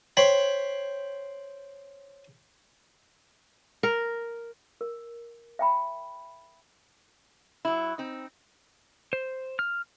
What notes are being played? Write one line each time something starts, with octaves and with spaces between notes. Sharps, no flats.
C5 C#5 G5 B5
A#4
A#4
E5 G5 B5
F#3 E4
C4 D#4
C5
F6